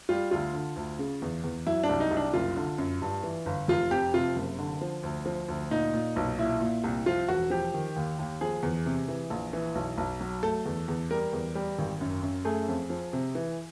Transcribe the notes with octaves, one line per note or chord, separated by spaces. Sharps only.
G3 F4
D2 F4
D3
D2
C#3
E2
E2
F#3 E4
D4
C2
D#4
C2
D4
F#1 F4
D3
F#2
G2
E3
G1
F1 F4
F2 G4
C3 F4
F#1
D3
F3
D2
F3
D2
A#2 D#4
A#2
B1
A#2 E4
A#2
C2
F3 F4
E1 F#4
F3 G4
D#3
D#2
D#2
F3 G#4
E2
C3
E3
A#1
E3
B1
B1
F#3
A3 A4
E2
E2
G3 A#4
E2
G3
G#1
F#2
F#2
A3 G#4
F2
F3
C3
E3